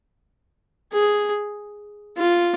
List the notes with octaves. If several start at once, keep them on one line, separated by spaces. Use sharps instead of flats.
G#4
F4